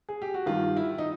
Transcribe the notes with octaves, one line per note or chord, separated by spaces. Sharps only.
G#4
G4
F#4
G2 D#3 F4
E4
D#4